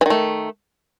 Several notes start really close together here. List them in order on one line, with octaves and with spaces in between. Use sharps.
E3 D#3 A3